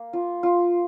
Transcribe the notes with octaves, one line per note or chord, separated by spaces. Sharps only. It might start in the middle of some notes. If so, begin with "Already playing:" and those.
Already playing: A#3
F4
F4